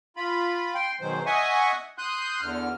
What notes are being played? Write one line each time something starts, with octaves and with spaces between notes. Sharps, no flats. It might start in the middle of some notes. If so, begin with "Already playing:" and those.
F4 B5
G5 C6
B2 D#3 F#3 G#3 C5
D#5 E5 F#5 G#5 C#6 D#6
C6 D#6 F#6 G6
E2 D3 F6